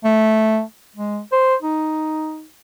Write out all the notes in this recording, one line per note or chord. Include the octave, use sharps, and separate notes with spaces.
A3
G#3
C5
D#4